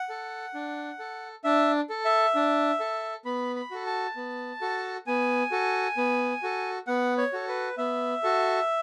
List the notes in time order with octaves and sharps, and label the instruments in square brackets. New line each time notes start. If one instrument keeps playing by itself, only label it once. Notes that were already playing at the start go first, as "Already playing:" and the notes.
Already playing: [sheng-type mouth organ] F#5
A4
D4
A4
D4 E5
A4
E5
D4
A4
B3 B5
B5
F#4 A4
A5
B3
F#4 A4
B3 G#5
F#4 A4
B3
F#4 A4
B3 F#5
C#5
F#4 A4
B4
B3 E5
F#4 A4